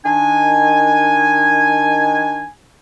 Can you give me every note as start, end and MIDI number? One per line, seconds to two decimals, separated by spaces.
0.06 2.46 51
0.06 2.46 62
0.06 2.46 80